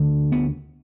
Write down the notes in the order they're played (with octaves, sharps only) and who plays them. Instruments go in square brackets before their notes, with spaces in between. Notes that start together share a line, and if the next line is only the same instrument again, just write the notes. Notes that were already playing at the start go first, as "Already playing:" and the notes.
Already playing: [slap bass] D2 D3
B3